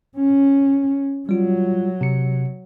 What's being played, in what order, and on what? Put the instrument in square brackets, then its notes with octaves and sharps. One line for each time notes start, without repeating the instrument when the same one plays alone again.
[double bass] C#4
[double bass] F#3 [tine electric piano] G3 F4
[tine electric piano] C3 C#7